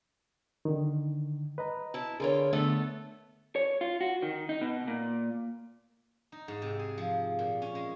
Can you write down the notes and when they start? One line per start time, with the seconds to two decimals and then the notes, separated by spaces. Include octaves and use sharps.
0.65 D3 D#3
1.58 B4 D#5 A#5
1.94 E4 A5
2.20 D3 F4 G#4 A#4 B4 C#5
2.53 D3 A3 B3 A4
3.56 C#5
3.81 F4
4.01 F#4
4.22 D#3
4.49 D#4
4.61 B2
4.87 A#2
6.32 D#4
6.48 G#2
6.62 C3
6.79 G#4
6.98 F3
7.39 A#2
7.62 C#4
7.75 G#3